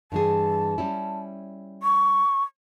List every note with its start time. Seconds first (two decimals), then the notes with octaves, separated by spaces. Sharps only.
0.12 G2 E3 G#4 A5
0.78 G3 C#4 E4
1.83 C#6